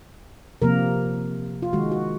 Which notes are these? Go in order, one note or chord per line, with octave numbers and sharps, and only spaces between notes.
C3 F3 A#3 A#4
F4
D#3 G#3 F#4
F#4